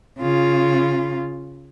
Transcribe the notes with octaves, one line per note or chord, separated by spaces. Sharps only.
C#3 F4